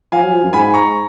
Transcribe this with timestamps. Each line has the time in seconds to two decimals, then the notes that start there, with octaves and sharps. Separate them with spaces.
0.12 F3 F5 G#5
0.23 F#3
0.33 F3
0.43 F#2
0.53 G#2 G#5 B5
0.74 A#5 C#6